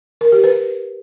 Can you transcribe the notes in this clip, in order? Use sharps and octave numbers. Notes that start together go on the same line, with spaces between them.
A#4
G4
B4